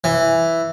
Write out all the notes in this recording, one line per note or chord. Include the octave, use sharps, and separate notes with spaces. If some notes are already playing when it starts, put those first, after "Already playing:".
E3